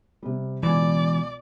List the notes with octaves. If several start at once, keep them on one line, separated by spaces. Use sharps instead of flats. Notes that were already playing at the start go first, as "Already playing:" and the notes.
C3 G3
C#2 B2 E3 D5 G#5